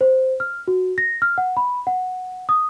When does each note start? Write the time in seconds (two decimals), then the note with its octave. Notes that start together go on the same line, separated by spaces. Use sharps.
0.01 C5
0.40 F6
0.68 F#4
0.98 A#6
1.22 F6
1.38 F#5
1.57 B5
1.87 F#5
2.49 D#6